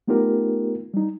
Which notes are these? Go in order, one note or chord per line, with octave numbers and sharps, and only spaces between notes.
A3 B3 D#4 F4 G4 A#4
G3 D#4